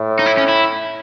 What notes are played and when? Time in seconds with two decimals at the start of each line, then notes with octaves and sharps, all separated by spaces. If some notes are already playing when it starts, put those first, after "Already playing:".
Already playing: A2
0.19 D#4
0.26 E4
0.38 C#4
0.49 E4